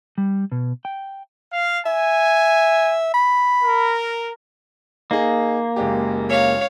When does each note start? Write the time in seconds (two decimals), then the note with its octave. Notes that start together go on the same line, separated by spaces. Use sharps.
0.18 G3
0.52 B2
0.85 G5
1.53 F5
1.86 E5 G#5
3.14 B5
3.63 A#4
5.11 A#3 D#4 G#4
5.76 F#1 G#3 G4
6.29 C#5 F5